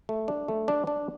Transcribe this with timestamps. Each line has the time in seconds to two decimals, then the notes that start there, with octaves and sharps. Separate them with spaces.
0.09 A3
0.28 D4
0.48 A3
0.68 D4
0.87 D4